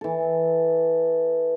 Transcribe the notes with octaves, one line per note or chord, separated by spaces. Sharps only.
E3 A4